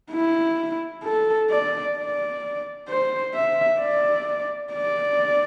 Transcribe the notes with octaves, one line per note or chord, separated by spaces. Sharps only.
E4
A4
D5
D5
C5
E5
D5
D5